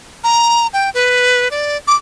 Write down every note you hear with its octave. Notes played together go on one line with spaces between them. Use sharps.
A#5
G5
B4
D5
D6